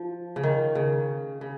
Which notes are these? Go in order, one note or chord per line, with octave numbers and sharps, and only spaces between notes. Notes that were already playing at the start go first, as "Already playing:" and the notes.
Already playing: F3
C#3
D#3
C#3
C#3